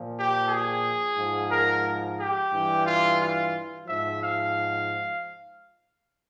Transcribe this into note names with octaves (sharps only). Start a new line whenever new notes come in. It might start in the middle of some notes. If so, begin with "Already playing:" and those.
Already playing: A#2 F3
G4
G#4
G#2 F3
A#4
G4
G2 E3
F4
F4
G#2 F3 E5
F5